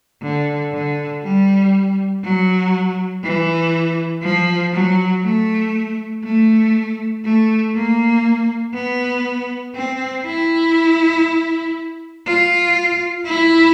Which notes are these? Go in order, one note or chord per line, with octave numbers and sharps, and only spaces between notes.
D3
D3
G3
F#3
E3
F3
F#3
A3
A3
A3
A#3
B3
C4
E4
F4
E4